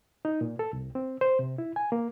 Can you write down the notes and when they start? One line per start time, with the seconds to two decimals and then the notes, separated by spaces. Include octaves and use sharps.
0.25 D#4
0.41 A#2
0.59 A4
0.73 C2
0.95 C4
1.21 C5
1.39 C3
1.58 E4
1.76 G#5
1.92 A#3